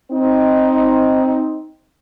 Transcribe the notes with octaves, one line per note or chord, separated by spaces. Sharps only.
C4 D#4